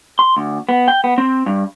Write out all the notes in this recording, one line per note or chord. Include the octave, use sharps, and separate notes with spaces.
C6
D2
B3
G5
B3
C4
G2